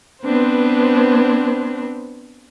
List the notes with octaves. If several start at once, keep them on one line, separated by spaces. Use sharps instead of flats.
B3 C4 D4 B4 C5